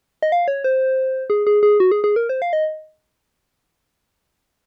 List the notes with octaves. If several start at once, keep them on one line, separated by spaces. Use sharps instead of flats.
D#5
F5
C#5
C5
G#4
G#4
G#4
F#4
G#4
G#4
A#4
C5
F5
D#5